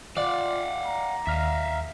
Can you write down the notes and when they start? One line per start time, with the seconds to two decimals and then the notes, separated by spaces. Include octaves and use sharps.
0.17 F4 D5 F5 F#5
0.86 A#5
1.27 D#2 E5 F5 F6